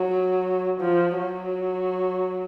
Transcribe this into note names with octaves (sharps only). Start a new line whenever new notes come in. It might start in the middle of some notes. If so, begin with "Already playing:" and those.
Already playing: F#3
F3
F#3